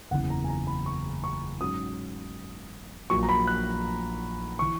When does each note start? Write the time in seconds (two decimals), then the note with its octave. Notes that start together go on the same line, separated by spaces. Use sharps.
0.11 F#1 E2 C#3 E3 F#5
0.30 A#5
0.44 G#5
0.48 A#5
0.67 B5
0.86 C#6
1.24 C#6
1.61 G#2 F#3 C#4 D#6
3.10 A#1 A#2 F#3 C#6
3.23 A#5
3.29 B5
3.47 F#6
4.59 E3 C#6